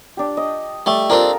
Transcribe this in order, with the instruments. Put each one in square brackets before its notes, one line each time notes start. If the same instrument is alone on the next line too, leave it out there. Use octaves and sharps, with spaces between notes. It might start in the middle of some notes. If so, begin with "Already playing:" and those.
[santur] D4 G4
D#5
[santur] G3 A5 [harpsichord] A3
[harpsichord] C4 D4 [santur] F4 A4 A#4